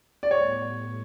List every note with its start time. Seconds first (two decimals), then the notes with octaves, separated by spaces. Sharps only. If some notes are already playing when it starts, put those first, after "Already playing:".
0.23 D5
0.31 A2 G3 B3 C#5